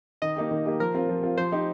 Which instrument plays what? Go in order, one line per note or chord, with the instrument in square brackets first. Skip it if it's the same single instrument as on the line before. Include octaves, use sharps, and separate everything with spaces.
[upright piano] D#3 [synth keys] D#5
[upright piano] A#3 D#4 G4
D#3
A#3 D#4 G4
[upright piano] F3 [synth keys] A#4
[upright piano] C4 F4
F3
C4 F4
[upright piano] F3 [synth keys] C5
[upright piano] D#4 G4